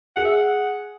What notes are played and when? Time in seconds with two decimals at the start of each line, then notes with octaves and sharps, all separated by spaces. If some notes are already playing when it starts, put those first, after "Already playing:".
0.16 G#4 F#5
0.25 E5
0.34 F#5